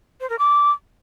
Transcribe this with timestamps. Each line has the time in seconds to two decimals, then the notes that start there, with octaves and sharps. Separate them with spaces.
0.21 C5
0.30 A#4
0.39 D6